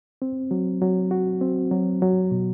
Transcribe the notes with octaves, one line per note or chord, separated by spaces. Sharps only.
C4
F#3
F#3
F#4
C4
F#3
F#3
B2